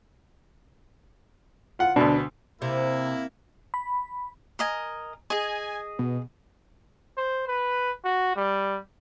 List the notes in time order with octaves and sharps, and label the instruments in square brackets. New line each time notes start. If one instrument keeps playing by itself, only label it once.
[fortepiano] F4 F#5
[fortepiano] D2 B2 [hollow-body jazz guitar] D4
[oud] C3 [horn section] A#3 E4
[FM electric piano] B5
[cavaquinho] A#4 D#5 G#5
[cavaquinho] G#4 D#5 [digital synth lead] G#5
[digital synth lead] B2
[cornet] C5
B4
F#4
G3